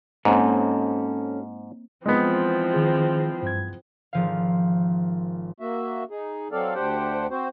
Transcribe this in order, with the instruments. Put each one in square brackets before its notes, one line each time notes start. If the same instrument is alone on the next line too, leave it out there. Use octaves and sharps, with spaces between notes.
[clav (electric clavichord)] G#2 [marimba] A#3 C4 C5 [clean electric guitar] C#4 F#4 A4
[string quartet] E3 F3 C4 [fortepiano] G#3 B3
[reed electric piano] D#3 G#4
G2 G#6
[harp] G#1 F3 F5
[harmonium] A#3 F#4 E5
D#4 G#4
F#3 C4 A4 D5 F5
D2 D4 G4 C5 F#5 G5
C4 F#4 C5